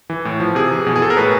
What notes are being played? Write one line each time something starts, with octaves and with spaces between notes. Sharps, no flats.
E3
A2
F3
C3 G#4
E3
B2
G#4
A4
A#4
A2 B4